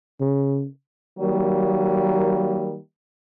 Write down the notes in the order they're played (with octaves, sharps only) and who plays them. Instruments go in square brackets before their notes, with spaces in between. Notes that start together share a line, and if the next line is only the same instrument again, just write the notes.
[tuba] C#3
[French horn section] D#3 F#3 G3 A#3